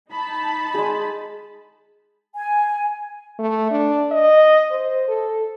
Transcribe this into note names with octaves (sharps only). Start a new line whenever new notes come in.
D#4 A5 B5
G#3 G#4
G#5
A3
D4
D#5
C5
A4